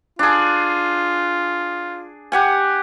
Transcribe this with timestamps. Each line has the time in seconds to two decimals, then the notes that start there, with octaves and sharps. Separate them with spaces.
0.19 D4 F4 G#4
2.32 G4 F#5 G#5